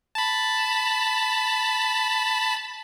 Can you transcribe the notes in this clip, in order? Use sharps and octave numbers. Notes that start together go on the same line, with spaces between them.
A5 B5